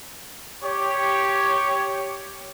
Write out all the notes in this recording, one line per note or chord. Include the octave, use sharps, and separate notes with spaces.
G4 C#5